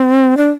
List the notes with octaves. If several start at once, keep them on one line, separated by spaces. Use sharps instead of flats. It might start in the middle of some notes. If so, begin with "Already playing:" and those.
Already playing: C4
D4